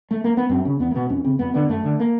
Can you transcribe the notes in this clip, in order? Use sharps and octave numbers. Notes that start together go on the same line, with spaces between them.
A3
A#3
B3
F#2 C4
C#3 C#4
E2 B3
A#3
B2 B3
F2 C#4
C#3 C4
F2 B3
D3 B3
F#2 A3
D3
A#3